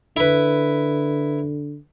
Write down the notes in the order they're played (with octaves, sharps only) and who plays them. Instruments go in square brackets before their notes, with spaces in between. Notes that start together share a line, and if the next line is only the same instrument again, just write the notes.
[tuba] D3 [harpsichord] E4 B4